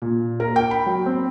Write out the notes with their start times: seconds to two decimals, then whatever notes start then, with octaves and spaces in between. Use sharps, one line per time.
0.02 A#2
0.40 A#4
0.56 G5
0.71 B5
0.86 F#3
1.06 C4